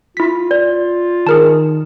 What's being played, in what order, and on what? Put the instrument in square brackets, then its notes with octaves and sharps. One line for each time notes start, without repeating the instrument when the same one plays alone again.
[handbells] E4 B6 [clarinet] F4
[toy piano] D5
[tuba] D#3 [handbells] G#4 A#4 A5